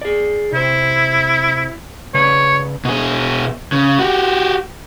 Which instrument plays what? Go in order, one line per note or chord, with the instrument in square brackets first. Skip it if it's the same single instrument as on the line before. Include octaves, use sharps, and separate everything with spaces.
[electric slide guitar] G#4 D5
[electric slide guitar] C3 C5 [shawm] E4
[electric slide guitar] C#3 B4 D5 [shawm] C#5
[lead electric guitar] B2 G#4
C#3
F#4 G4